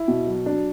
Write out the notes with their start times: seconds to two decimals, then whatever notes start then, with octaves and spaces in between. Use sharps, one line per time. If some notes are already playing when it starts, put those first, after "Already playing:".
Already playing: E4
0.08 B2
0.27 F#3
0.46 D4